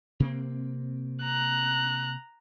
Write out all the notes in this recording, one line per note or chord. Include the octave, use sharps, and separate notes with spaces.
C3 A#3 C4
A#5 F#6